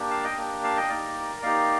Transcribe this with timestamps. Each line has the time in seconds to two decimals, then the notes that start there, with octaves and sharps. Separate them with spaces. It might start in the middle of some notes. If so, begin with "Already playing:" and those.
Already playing: A#3 D4 G4
0.10 F5 A5
0.24 D#5 G5
0.37 A#3 D4 G4
0.64 F5 A5
0.76 D#5 G5
0.89 A#3 D#4 G4 A#4 D5
1.42 A#3 D#4 G4 D5 F5